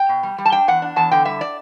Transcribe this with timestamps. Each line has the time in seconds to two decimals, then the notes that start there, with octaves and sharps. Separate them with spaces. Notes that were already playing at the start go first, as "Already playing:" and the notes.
Already playing: G5
0.09 B2
0.23 G3
0.38 G3
0.45 A5
0.52 D4 G5
0.68 E2 F#5
0.82 D4
0.96 E2 A5
1.11 D3 G5
1.25 G3 E5
1.41 D5